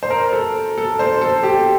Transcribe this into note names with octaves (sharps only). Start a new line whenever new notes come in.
C5
A#4
A4
A4
C5
A4
G4